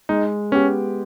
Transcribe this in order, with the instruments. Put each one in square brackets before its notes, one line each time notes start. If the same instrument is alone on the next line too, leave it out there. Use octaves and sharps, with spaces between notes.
[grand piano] G#3 [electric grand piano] D#4
[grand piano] B3 G4 [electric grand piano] C#4